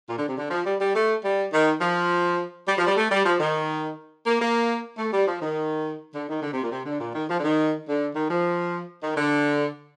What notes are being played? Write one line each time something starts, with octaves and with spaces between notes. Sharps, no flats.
A#2
D3
C3
D3
F3
G3
G3
A3
G3
D#3
F3
G3
F3
G3
A3
G3
F3
D#3
A#3
A#3
A3
G3
F3
D#3
D3
D#3
D3
C3
A#2
C3
D3
A#2
D#3
F3
D3
D#3
D3
D#3
F3
D#3
D3